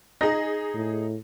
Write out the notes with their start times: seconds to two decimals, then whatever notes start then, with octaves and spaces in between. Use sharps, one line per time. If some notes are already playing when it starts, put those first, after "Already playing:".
0.21 D#4 G#4 A#6
0.74 A2